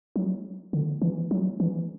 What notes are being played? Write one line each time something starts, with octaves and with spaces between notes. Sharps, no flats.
F#3
D3
E3
F#3
E3